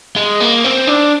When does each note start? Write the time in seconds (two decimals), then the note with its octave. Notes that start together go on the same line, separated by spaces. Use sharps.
0.16 G#3
0.40 A#3
0.64 C4
0.87 D4